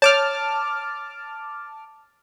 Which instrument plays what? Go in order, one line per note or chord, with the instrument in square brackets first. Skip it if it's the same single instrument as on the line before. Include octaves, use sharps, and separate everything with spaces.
[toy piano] C#5 [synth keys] A5 D6 F6